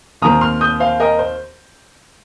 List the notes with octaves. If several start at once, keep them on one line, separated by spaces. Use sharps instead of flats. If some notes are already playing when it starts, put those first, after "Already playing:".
D#2 D#3 C4 A#5 D#6
C6 F6
D#6 G6
C5 F5
A#4 D#5
C5